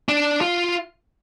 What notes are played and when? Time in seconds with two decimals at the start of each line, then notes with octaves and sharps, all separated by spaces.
0.09 D4
0.41 F4